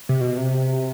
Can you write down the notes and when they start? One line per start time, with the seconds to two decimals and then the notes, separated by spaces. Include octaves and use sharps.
0.09 C3
0.21 B2
0.37 C3